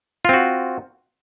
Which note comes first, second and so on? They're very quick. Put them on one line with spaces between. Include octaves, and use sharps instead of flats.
F4 C4 F#4